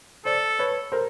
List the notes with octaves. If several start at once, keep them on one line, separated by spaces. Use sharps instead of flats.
A4 C5 D5
B4 C#5
A#4 C5